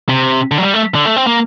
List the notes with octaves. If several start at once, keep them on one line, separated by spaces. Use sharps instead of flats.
C3
D3
F#3
G3
A3
D3
A3
C4
A#3